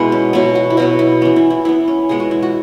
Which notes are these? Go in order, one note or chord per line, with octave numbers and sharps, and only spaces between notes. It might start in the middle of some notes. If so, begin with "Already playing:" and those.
Already playing: B2 G#3 B3 E4
C#4
B2 F#3 B3 E4
F#4
E4
B2 F#3 B3 F#4
E4
E3 B3 C#4
E4
E4
E3 B3 E4
C#4
B2 G#3 B3 G#4
F#4
E4
F#4